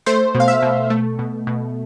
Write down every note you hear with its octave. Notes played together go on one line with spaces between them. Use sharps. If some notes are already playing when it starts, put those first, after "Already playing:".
A3 C5
B2
F5
E5
B2
A3
B2
B2